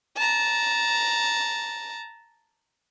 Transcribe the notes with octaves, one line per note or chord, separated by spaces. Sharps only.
A5 A#5